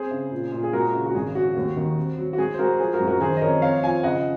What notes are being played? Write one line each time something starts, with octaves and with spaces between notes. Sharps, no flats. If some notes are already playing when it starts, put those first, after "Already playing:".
Already playing: C4 G#4 C5
C#3
A#2
A#2
G#4
G#3 F#4 A#4
C#3
F#4
G#1 G#4
F#3 F#4
D#2
D#3
C4
F#3
F#4
G#3 G#4
C5
G#3 F#4 A#4
F3 G#4 C5
F#4 A#4
F#2
F#4 A#4
D#3 G#4 C5
D#5
F2 A#4 C#5
C4 C#5 F5
F3 F5 G#5
C#3 D#5 F#5